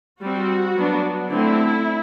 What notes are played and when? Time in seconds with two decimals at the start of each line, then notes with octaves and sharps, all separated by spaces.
0.21 G3 C4 F#4
0.75 F#3 B3 D4
1.29 D3 A3 C4 E4